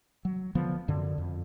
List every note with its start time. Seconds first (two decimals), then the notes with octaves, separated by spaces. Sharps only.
0.25 F#3
0.55 D3 F3 B3
0.88 F#2 D3
1.18 F2